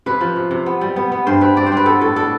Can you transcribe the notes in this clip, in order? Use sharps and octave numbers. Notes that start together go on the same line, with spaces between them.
C3 B4
F3
C3
C3
B3
G3
B3
B3
G2 C5
C4 B4
C4 D5
C5
C4 B4
B3 A4
A2 A4
D4 A4